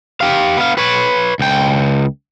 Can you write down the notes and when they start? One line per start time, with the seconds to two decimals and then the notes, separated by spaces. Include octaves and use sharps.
0.21 G4 F5
0.57 B3 F5
0.78 B4 C#5
1.39 C#2 G5